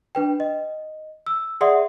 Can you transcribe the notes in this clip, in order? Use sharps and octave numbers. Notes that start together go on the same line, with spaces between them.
D4 B4 G5
D#5
E6
G#4 D5 E5 F#5 C6 D#6